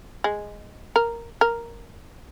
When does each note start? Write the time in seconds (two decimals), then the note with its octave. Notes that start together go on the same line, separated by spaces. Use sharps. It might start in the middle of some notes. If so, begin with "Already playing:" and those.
0.24 G#3
0.96 A#4
1.41 A#4